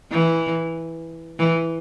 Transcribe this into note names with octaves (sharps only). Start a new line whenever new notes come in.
E3
E3